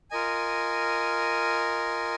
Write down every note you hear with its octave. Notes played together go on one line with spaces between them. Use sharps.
F4 A#4 D#5 G#5